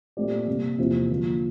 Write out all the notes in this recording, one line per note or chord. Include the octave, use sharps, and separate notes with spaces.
A#2 A3 C4 G4 D5
C3 G3 A#3
E2 C3 F3 A#3 F4
D3 F3 A#3